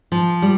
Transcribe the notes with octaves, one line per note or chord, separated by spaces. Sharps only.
F3
G3